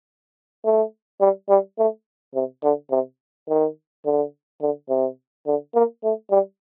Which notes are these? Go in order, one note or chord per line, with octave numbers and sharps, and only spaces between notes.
A3
G3
G3
A3
C3
D3
C3
D#3
D3
D3
C3
D3
A#3
A3
G3